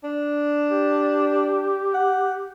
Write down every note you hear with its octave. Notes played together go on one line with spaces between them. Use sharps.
D4
G4
F#5